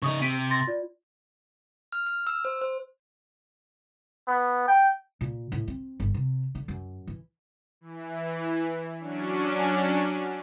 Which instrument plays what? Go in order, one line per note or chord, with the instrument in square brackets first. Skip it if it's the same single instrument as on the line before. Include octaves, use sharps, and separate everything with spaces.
[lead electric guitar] C#3 D#4 [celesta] C#6 D#6
[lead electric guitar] C3 [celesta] B6 D7 D#7
[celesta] C6 A6 A#6
F4 D5
[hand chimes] F6
F6
E6
C5
C5
[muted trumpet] B3
G5
[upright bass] A#2
A2
C4
G1
C3
D3
F#2
E3
[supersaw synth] E3
F#3 C#4 D4